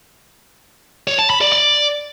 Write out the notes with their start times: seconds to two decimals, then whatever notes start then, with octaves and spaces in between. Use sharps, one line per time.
1.07 C#5
1.19 A5
1.30 B5
1.41 D5
1.52 D5